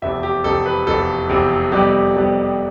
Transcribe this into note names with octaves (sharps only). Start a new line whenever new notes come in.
F1 E2 C3 E5
G4
F1 E2 C3 A4
B4
F1 E2 C3 A4
F1 E2 C3
F2 C3 G3 B3 G4
F2 C3 G3 B3